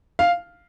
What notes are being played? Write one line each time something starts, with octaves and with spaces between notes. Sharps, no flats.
F5